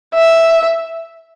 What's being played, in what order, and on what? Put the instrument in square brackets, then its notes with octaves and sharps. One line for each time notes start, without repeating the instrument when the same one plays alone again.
[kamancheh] E5